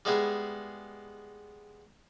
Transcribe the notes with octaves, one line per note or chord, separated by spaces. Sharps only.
G3 G#3 B3 E4 G#4